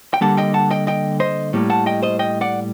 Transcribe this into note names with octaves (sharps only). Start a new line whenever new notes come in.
G5
D3 G3 A#3 F#5 A5
D#5 G5
F#5 A5
D#5 G5
D#5 G5
C5 D#5
A2 G3 A#3
F#5 A5
D#5 G5
C5 D#5
D#5 G5
D5 F#5